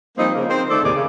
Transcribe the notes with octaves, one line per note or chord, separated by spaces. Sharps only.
F3 G3 A#3 C4 D#4
C#3 A#3
C4 D#4 A#4 C5
D#3 A3 D#4 A4 D5
D#2 A2 C3 D#3 G#4 D5
C#3